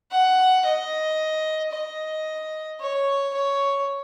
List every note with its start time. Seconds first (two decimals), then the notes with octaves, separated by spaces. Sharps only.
0.11 F#5
0.65 D#5
1.72 D#5
2.81 C#5
3.34 C#5